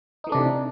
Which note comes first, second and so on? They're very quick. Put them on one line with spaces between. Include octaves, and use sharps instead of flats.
D#4 E3 A3 D4 C3